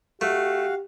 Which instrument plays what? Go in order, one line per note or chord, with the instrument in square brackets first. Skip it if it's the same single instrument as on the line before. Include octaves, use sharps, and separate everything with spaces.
[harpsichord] A3 [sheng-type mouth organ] F#4 F5 [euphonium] G4